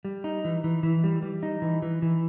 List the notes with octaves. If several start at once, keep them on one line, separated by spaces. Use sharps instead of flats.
G3
D#4
E3
E3
E3
G3
G3
D#4
E3
E3
E3